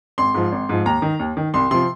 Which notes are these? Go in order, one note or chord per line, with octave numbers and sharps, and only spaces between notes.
G#1 C6
G#2 F3
G#1
G#2 F3
D#2 A#5
D#3
D#2
D#3
C2 C6
C3 F3 C6